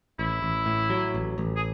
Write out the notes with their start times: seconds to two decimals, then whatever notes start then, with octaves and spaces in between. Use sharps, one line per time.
0.19 A1 E4
0.42 A1
0.66 A2
0.90 F#3
1.14 A1
1.38 A1
1.56 G#4